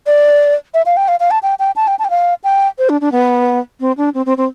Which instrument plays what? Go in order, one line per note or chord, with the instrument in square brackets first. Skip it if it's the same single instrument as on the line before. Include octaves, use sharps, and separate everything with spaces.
[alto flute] D5
E5
F5
G5
F5
F5
A5
G5
G5
A5
G5
A5
G5
F5
G5
C5
D4
D4
B3
C4
D4
C4
C4
C4